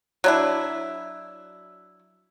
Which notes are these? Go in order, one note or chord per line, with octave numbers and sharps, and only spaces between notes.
F#3 D4 E4